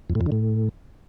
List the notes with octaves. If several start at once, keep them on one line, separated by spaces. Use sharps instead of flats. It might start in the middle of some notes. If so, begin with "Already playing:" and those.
F2
A2
F2
D3
A2